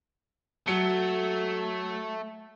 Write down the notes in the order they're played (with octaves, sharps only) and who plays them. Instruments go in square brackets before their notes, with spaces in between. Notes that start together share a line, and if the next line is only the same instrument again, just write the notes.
[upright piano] F#3 C#7 G7 [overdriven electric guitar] A3